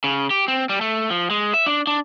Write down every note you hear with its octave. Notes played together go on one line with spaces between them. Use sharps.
C#3
G4
C4
G3
A3
F3
G#3
E5
D4
D4